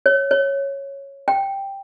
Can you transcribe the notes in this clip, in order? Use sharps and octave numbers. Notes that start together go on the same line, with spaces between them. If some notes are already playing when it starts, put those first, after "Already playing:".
C#5
C#5
G5